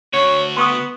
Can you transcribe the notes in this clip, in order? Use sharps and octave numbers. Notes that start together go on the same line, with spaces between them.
D2 F#4 C#5
B3 C6 C#6 D#6